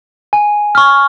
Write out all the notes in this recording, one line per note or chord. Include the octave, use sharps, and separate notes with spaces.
G#5
C#6 F6